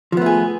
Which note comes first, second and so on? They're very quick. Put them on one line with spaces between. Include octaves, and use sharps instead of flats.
F3 B3 A3 G#4